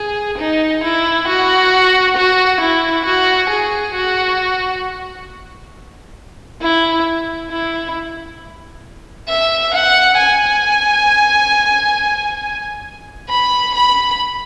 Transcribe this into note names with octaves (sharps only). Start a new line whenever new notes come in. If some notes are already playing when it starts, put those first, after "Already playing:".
Already playing: G#4
D#4
E4
F#4
F#4
E4
F#4
G#4
F#4
E4
E4
E5
F#5
G#5
B5
B5